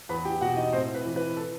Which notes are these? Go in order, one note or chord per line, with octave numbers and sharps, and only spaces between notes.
E2 B4 B5
G4 G5
B2 F#4 F#5
D#4 D#5
A2 C4 C5
B4
E3
B4
A4